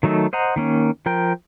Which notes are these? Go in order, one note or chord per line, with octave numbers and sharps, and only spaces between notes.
D#3 F#3 A3 D#4 A4
C5 D#5 F#5 A#5
D#3 A#3 C#4
F3 A#4 G5